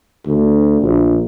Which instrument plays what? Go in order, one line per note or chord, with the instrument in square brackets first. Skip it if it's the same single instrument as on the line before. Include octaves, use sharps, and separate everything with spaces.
[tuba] D2
A#1